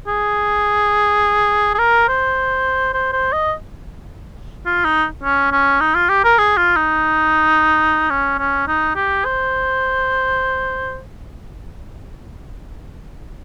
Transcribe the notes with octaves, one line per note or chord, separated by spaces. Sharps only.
G#4
G#4
A#4
C5
C5
C5
D#5
F4
D#4
C#4
C#4
D#4
F4
G4
A#4
G#4
F4
D#4
C#4
C#4
D#4
G4
C5